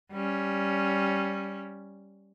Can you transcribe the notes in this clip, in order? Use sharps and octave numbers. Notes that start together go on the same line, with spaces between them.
G3 C#4